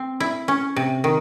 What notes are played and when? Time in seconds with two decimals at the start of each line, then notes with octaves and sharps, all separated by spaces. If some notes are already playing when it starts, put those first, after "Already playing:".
Already playing: C4
0.20 E4
0.48 C#4
0.76 C3
1.04 D#3